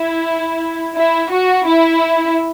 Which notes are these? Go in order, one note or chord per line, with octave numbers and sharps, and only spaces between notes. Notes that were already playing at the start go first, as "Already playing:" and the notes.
Already playing: E4
E4
F#4
E4